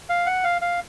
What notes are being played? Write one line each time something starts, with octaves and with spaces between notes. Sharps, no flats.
F5
F#5
F5
F5